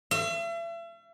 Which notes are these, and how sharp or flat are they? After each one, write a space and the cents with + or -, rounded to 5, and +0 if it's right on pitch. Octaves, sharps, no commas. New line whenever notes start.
E5 +40